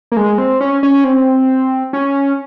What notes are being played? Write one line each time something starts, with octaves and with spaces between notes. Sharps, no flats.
A#3
G#3
C4
C#4
C#4
C4
C#4